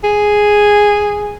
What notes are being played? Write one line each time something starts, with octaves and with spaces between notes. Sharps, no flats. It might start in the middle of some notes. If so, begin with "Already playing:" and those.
G#4